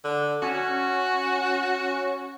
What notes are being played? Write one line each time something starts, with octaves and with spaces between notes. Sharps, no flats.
D3
C#4 F#4